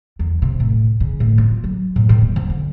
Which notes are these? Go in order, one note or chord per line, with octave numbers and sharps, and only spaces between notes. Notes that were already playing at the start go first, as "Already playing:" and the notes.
E2
C3
A2
C#3
A2
F4
F#3
A2
D#3
D#1
F3
D3